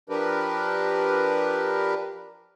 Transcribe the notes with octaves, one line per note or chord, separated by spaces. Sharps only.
F3 D4 G4 A#4 B4